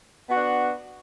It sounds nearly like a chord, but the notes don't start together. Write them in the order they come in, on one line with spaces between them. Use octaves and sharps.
B3 F#4 D4